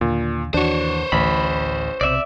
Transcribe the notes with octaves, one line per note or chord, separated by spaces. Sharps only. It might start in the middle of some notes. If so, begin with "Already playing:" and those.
D#2 A#2 D3
D#2 E3 D4 F#4 C5 C#5
A1 D2 A2 B5
B1 C3 D5 E5